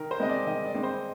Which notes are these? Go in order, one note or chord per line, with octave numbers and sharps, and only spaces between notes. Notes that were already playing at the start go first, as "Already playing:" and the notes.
Already playing: D#3 A#4
C5
G#3 C4 D#4 D#5
D5
D#3 D#5
D5
G#3 C4 D#4
C5